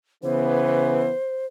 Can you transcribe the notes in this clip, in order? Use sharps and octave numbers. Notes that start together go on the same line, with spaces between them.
C#3 E3 B3 C5